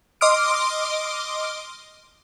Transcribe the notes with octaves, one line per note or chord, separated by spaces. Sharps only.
D#5 C6 D6 D#6 F6 D7